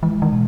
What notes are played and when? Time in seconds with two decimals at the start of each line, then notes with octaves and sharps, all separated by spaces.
0.03 E3 G#3
0.22 D#3
0.32 B2